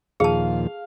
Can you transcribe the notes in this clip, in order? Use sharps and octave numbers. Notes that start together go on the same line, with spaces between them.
D#2 A#2 F3 G#4 F5 A5